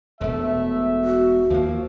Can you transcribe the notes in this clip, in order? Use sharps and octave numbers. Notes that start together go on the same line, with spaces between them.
E1 B2 A3 E5
F#4
D#2 F3 A#3